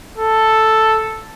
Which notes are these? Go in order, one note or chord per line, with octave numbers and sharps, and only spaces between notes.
A4